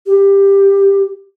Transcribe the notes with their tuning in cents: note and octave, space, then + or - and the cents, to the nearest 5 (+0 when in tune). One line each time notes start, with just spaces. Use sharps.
G4 +15